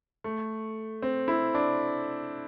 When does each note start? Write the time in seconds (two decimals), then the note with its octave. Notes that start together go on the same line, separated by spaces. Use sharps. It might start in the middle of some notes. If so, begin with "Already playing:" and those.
0.24 A3
1.02 C4
1.28 E4
1.55 D4